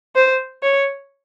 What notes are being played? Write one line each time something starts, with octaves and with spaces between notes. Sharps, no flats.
C5
C#5